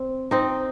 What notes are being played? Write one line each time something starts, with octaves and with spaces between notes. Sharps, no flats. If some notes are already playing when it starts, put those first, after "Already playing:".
Already playing: C4
C4 D#4